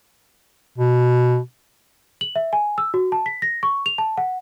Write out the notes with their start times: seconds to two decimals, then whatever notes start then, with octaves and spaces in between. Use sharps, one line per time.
0.78 B2
2.21 F#7
2.36 E5
2.53 G#5
2.78 E6
2.94 F#4
3.12 A5
3.26 B6
3.42 A#6
3.63 C#6
3.86 F7
3.98 A5
4.17 F#5